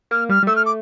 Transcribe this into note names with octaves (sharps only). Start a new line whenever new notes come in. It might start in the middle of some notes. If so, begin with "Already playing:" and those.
A#3 F6
G3 F6
G3
A3 E6
F6
D6